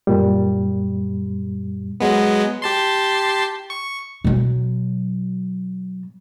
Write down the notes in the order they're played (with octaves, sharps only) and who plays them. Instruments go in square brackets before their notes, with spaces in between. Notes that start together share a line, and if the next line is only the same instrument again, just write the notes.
[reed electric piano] F#2 A#2 G3
[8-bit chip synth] F#3 G#3 B3
G4 A5 C6
C#6
[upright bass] B2 F#3